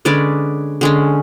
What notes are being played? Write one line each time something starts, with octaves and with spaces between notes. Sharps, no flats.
D3 G#3 C#4 B4 D5
D3 G#3 C#4